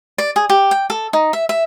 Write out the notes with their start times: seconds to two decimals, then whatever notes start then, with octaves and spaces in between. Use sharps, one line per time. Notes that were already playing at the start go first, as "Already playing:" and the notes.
0.18 D5
0.36 G#4
0.50 G4
0.71 G5
0.90 A4
1.13 D#4
1.33 E5
1.49 E5